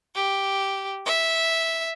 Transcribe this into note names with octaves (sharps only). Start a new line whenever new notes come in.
G4
E5